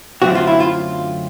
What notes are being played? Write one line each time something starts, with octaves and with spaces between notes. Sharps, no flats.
F#2 D3 F#3 A3 C4 F#4
F4
E4
F4